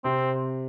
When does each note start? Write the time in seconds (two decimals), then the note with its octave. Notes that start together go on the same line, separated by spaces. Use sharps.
0.04 C3 C4